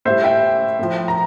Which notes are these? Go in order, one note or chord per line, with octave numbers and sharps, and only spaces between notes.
A2 G3 C5 E5
E5 G5
A2 F3
A#5